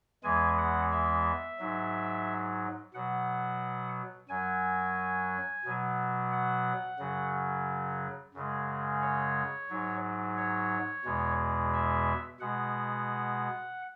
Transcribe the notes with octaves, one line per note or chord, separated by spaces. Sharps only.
E2 E3 G#3 G#5
F#5
E5
G#2 F#3
B2 F#3 F#5
F#2 F#3 G#5
B2 F#3
F#5
F#2 C#3 F#3
F#2 C#3 G#3
C#5
G#2 F#3
C#5
E2 B2 G#3
E5
B2 G#3 F#5